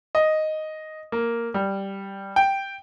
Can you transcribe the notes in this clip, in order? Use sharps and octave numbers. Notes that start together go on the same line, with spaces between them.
D#5
A#3
G3
G5